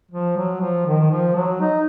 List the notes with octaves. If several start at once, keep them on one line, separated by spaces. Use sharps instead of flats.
F3
F#3
F3
D#3
F3
F#3
D#4